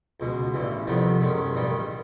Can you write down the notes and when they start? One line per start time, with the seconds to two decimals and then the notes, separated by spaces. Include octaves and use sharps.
0.20 C#2 B2 G#3
0.54 A1 G2 E3
0.87 F2 C3 D#3 G3 B3
1.21 F#2 D#3 G#3 C#4
1.55 A1 G2 D#3 G3